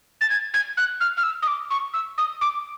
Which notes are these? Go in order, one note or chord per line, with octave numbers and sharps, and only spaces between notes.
A6
G#6
G#6
F#6
F6
F6
E6
D#6
D6
C#6
E6
D#6
D6